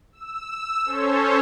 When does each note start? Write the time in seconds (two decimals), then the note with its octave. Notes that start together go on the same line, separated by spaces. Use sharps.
0.12 E6
0.85 C#4 A4 C5 C#5